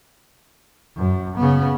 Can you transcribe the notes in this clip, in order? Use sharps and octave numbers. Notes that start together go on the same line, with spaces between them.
F#2
C#3 B3